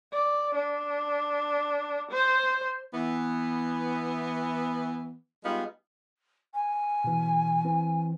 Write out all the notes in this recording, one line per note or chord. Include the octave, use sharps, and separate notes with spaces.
D5
D4
C5
E3 B3
G3 G#3 B3 D#4 F4
G#5
B2 E3
E3 C4